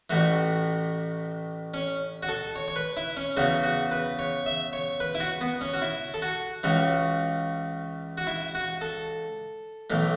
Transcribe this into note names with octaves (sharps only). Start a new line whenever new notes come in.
A1 A2 E3 F#4
C#4
F#4
A4
C#5
C#5
B4
E4
C#4
E2 C#3 E3 F#4
F#4
B4
C#5
E5
C#5
B4
E4
F#4
B3
C#4
F#4
E4
A4
F#4
C#2 C#3 E3 F#4
F#4
E4
F#4
A4
B1 A2 E3